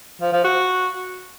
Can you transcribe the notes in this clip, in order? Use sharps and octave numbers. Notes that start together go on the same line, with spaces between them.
F3
F3
F#4